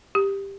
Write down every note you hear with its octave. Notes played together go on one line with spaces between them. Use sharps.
G4